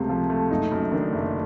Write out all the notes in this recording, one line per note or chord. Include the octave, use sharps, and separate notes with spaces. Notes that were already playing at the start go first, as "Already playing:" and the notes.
Already playing: C#2 C3 A3
F3
A3
F#1 D#4
F#2
D#3 D4
F#1